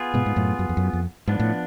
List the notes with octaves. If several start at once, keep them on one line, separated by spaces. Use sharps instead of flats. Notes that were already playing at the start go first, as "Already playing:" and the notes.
Already playing: B3 F4 G#4
G#2 B2
G#2
F#2 A2
F#2
F2
F#2
F2
G#2 F3 B3 D4
A2